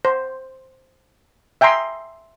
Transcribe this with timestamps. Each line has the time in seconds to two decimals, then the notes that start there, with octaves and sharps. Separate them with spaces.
0.05 C5
1.61 E5 G5 G#5 A#5 C6 D#6